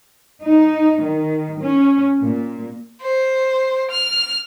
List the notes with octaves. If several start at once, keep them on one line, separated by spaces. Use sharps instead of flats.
D#4
D#3
C#4
A#2
C5
F6